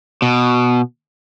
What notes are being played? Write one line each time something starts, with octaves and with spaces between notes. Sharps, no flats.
B2